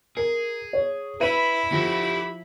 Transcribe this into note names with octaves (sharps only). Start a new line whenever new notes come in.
G#4 A#4
C#5
E4 B4 E5 B5 D#7
F3 G4 F#5